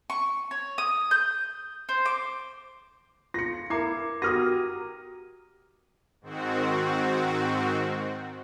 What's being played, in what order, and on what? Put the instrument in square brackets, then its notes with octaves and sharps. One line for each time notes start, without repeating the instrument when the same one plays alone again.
[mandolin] C#6
C#5
D#6
G6
C5
D6
[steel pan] F4 [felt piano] A#6 C#7
[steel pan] E4 A#4 [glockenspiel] A#5 D6 G#6 [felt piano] C7
[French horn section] F#4 G4 A#4 [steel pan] F#5 [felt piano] D#6 F6 A#6 [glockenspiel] D#7
[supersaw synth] G#2 D#3 C4 F#4